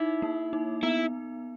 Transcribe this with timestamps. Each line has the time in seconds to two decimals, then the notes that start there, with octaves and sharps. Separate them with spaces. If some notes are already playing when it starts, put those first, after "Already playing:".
Already playing: D#4 E4
0.22 A#3
0.53 D#4
0.83 B3 E4